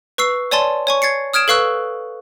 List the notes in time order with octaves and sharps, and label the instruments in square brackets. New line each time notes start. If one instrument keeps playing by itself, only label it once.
[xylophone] B4 C#6 E6 C7
C#5 D5 G#5 A5 C6 A6
C#5 G#5 C#6
G#6 A6 C7 C#7
D#6 F6 G#6 D7 E7
A4 B4 F5 C#6 E6 F#6